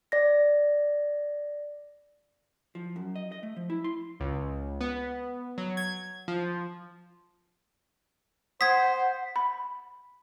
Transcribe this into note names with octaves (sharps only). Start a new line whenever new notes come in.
D5 A#6
F3
F#2
D#5
D#5
A3
F3
E4
C6
C#2
B3
F#3
G#6
F3
C5 F#5 D#6 G#6 B6
B5